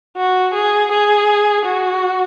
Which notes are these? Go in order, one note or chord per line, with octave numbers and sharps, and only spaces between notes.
F#4
G#4
G#4
F#4